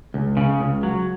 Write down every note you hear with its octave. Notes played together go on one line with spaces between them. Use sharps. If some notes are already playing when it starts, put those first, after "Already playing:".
C#2
C#3
C#2
F#3